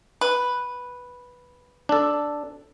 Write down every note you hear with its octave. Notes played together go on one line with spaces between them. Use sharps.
B4
D4 A4